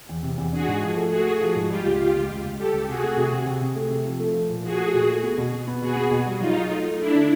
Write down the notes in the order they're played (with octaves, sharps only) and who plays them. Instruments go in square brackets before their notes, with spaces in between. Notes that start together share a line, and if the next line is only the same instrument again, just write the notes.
[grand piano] E2
C3
E2
[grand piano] D4 [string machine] F#4 G#4
[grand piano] G#2
F3
A3
[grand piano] A3 [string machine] F#4 G#4
[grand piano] A3
F3
G#2
[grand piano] G3 [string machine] F4 G4
[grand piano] C#2
[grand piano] C#2 [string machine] F4 G4
[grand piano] C#2
C#2
C#2
[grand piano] G3 [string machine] G4 A4
[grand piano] C#2
[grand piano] C3 [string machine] F#4 G#4
[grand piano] A3
C3
C3
C3
C3
A3
C3
F3
A3
F3
A#2
[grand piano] F3 [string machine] F#4 G#4
[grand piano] A3
A#2
A3
B3
B2
B2
B3
[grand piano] B2 [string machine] F#4 G#4
[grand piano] B3
B2
G3
[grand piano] F#3 [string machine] D#4 F4
[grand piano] F#3
A3
A3
[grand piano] A3 [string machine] D4 E4
[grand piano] D3